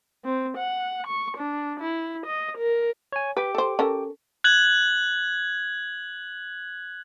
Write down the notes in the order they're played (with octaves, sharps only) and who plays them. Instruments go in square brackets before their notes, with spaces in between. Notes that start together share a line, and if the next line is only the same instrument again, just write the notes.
[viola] C4
F#5
C#6
D4
E4
D#5
A#4
[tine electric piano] C#5 G#5
[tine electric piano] G4 G5 D6 [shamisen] B4
[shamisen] A4 C5
C#4 A4 A#4
[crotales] F#6 G#6 F#7